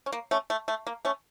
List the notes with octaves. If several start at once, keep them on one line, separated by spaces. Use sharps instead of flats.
C#4
A#3
A3 C#4
A3
A3
A#3
A3 C#4